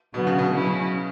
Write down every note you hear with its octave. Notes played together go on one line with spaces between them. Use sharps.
B2 D3 F#3 B3
C#3
B2
F#3 C#4 E4